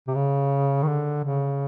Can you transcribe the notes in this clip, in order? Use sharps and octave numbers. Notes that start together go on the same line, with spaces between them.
C3
C#3
D#3
D3
C#3